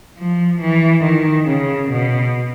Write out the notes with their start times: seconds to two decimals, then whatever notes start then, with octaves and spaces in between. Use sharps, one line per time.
0.17 F3
0.61 E3
1.04 D#3
1.47 C#3
1.90 B2